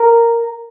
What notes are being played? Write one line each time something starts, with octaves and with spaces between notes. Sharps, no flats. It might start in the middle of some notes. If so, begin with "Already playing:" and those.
Already playing: A#4